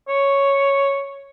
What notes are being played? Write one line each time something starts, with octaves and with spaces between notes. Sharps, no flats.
C#5